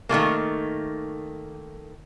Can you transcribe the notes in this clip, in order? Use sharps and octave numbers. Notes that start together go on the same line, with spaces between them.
D#3 F3 A3 A#3